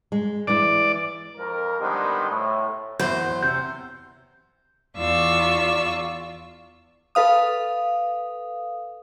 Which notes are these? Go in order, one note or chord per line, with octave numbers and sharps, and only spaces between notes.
G#3
E3 G#3 E4 D5
F2 A#4
D3 D#3 G3 G#3 B3 C4
A2
E2 F#3 C5 G6
C3 G6
E2 F4 D5 C#6 E6
A4 B4 F5 D#6